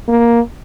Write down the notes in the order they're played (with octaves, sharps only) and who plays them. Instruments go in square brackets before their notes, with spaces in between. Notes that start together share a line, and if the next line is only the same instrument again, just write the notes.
[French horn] A#3